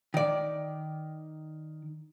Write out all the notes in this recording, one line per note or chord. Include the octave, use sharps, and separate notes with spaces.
D#3 D5